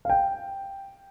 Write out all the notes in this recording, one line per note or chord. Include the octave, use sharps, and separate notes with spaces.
F5
G5